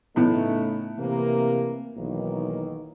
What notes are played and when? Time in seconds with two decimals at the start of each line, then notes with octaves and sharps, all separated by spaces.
0.16 A2 C#3 A3 B3 D#4
0.99 C3 E3 A#3
1.97 B1 D#3 E3 A#3